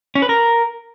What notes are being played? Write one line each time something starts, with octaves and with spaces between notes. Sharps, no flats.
C#4
B4
A#4